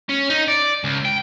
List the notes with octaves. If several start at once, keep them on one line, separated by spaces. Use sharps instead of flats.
C#4
D#4
D5
C#2
G5